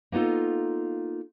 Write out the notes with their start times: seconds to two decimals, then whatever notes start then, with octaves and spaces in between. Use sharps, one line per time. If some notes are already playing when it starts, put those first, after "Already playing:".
0.12 A#3 B3 D#4 F4 A4